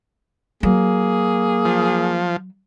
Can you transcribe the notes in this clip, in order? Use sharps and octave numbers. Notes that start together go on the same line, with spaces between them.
F#3 A#3 G#4
F3